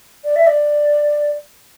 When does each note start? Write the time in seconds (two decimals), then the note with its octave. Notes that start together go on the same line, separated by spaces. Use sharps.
0.24 D5
0.36 E5
0.47 D5